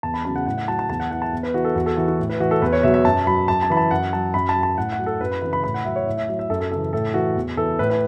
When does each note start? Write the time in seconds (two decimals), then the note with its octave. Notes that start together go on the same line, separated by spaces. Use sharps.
0.03 E2 A5
0.14 B5
0.25 C#3 F#3 A5
0.36 F#5
0.46 A2 F#5
0.58 F#5
0.68 F#3 A5
0.79 A5
0.89 E2 A5
1.00 F#5
1.11 E3 F#5
1.22 A5
1.32 E2
1.43 B4
1.54 E3 F#4
1.64 A4
1.75 E2 F#4
1.86 A4
1.97 E3 F#4
2.08 F#4
2.19 A2
2.30 B4
2.40 E3 F#4
2.51 A4
2.62 E2 B4
2.73 C#5
2.83 B2 F#3 E5
2.94 E5
3.05 F#2 A5
3.26 F#3 B5
3.48 F#2 A5
3.63 A5
3.70 E3 B5
3.77 A5
3.91 F#2 F#5
4.13 F#3 A5
4.34 F#2 B5
4.49 A5
4.56 F#3
4.63 A5
4.77 A2 F#5
4.92 F#5
4.99 F#3
5.06 A4
5.20 F#2 B4
5.31 B5
5.42 C#3 E3 B5
5.53 B5
5.64 A2 B5
5.74 F#5
5.85 F#3 E5
5.96 C#5
6.07 A2 E5
6.17 E5
6.28 F#3 E5
6.39 E5
6.50 F#2 A4
6.60 A4
6.71 C#3 E3 A4
6.93 A2 A4
7.14 E3 F#4
7.36 E2
7.57 E3 A4
7.79 A2 B4
7.90 B4